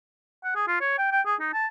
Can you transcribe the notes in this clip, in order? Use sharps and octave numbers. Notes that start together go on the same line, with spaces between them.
F#5
G#4
F4
C#5
G5
G5
G#4
D#4
A5